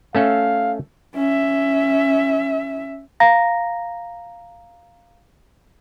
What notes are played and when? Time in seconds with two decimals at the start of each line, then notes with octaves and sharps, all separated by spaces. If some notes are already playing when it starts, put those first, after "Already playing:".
0.15 A3 C#4 A4 F5
1.14 C#4 E5
3.20 F5 A#5 A#6